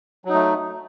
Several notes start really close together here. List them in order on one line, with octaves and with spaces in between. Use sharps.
F#3 D#4 A3